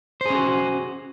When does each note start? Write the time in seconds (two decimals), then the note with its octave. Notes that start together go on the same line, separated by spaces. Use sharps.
0.21 C5
0.26 G#4
0.30 C#4
0.35 F#4